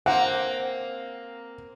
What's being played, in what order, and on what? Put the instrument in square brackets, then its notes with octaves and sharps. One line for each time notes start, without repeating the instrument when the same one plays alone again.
[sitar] A#3 C4 [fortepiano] F#5